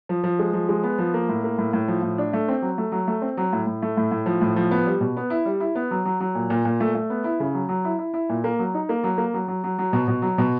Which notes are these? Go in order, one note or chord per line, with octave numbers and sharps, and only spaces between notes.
F3
F3
G#3
F3
G#3
B3
F3
A#3
A2
A#3
A2
A2
F3
A2
D4
A3
C4
F#3
A3
F#3
A3
C4
F#3
A2
A2
A3
A2
A2
F3
A2
F3
B3
G3
B2
B3
E4
G3
E4
B3
F#3
F#3
F#3
A#2
A#2
A#2
A3
A3
B3
E4
C#3
F#3
F#3
E4
E4
E4
A#2
A#3
F#3
D#4
A#3
F#3
A#3
F#3
F#3
F#3
F#3
B2
B2
F#3
B2